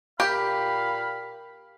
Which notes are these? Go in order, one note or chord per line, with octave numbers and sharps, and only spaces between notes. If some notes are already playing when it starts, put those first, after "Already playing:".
A#2 G4 F5 B5